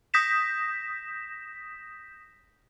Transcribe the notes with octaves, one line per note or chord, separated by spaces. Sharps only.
D#6 G6 A#6 B6 E7